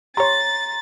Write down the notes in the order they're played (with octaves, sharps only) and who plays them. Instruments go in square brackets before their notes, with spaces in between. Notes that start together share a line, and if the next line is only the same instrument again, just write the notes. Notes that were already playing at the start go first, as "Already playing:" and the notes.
[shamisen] G4 C#5 [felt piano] A#5 C6 [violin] A6